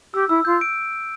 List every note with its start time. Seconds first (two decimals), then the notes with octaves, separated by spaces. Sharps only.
0.14 G4 E6
0.29 E4 E6
0.45 F4 G6
0.61 D7